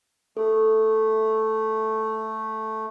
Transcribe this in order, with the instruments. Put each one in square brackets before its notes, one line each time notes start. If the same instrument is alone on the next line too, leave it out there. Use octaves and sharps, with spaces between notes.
[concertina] A3 [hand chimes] A4